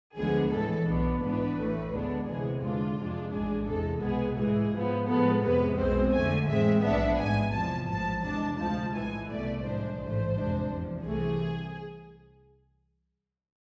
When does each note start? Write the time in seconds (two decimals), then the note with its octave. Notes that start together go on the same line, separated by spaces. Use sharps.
0.16 D2 D3 F3 G#3 B3 G#4
0.51 A2 E3 G#3 A4
0.86 B1 B2 B3 D4
1.21 G#1 G#2 E3 B3 D4 B4
1.57 A1 A2 E3 A3
1.91 D2 D3 G#3 B3 D4
2.27 D2 C3 E3 G#3 B3 G#4
2.62 E2 D3 G#3 D4 F4
2.97 F2 C3 G#3 D4
3.32 A1 G#2 G#3 D4 G#4
3.67 E2 C3 G#3 A4
4.02 C2 B2 G#3 B3 G#4
4.38 A2 E3 G#3 G#4
4.73 G#2 F3 B3
5.07 A2 F3 G#3 B3 A4
5.43 F2 C3 G#3 B3 B4
5.78 B1 B2 G#3 C4 C5
6.13 F2 D3 A3 G#5
6.48 A2 E3 G#3 C4 E5
6.83 B1 A2 F3 B3 D4 E5
7.18 A1 G#2 G#3 G#5
7.53 E2 C3 F3 A5
7.89 A1 G#2 F3 A5
8.24 E2 C3 G#3 D4 A5
8.59 D2 C3 F3 G#3 A5
8.94 B1 A2 E3 G#3 G#5
9.29 C2 B2 A3 D5
9.64 A2 F3 G#3 D4 C5
9.99 A1 G#2 E3 A3 C5
10.35 F2 C3 G#3 D4
10.70 E2 C3 F3
11.05 C2 C3 E3 A3 G#4